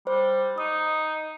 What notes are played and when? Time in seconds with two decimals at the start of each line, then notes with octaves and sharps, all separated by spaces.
0.07 G3 C5
0.58 D#4 D#6